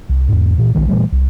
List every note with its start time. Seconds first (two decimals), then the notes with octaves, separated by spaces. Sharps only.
0.09 C2
0.29 E2 G#2
0.58 A#2 E3
0.75 A#1 D#2 D#3 G#3
0.88 A#2 E3 G3 A3
1.12 C2